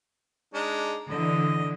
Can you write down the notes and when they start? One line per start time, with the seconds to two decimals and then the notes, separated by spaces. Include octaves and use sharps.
0.54 G#3 D4 D#4
1.09 D3 E3 D#5